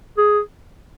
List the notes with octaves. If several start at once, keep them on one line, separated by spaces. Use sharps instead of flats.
G#4